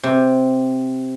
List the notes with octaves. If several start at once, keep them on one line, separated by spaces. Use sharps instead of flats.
C3